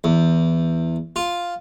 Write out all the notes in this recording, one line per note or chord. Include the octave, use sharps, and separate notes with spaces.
E2
F4